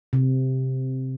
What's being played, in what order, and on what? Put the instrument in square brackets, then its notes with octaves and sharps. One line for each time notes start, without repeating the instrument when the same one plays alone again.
[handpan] C3